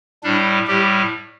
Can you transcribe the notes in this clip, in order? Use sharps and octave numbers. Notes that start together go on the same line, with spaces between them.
A2 G3 D4
A2 G3 G4